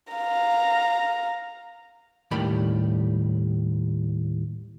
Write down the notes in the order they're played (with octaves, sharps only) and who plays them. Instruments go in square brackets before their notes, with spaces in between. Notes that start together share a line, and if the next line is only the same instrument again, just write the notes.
[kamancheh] F5 A#5
[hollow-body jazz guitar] D#2 A2 G3 A#3 G5 B5